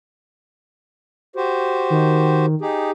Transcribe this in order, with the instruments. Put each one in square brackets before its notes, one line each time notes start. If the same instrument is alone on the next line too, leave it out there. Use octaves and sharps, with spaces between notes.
[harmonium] F#4 G4 C5
[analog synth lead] D#3
[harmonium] D#4 G4 G#4